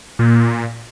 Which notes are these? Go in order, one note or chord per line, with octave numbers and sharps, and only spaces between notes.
A#2